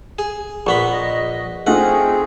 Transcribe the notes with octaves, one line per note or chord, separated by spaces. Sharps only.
G#4
A#1 B3 B5 C#6
D#5
A3 C4 D#4 F4 G#4 F#5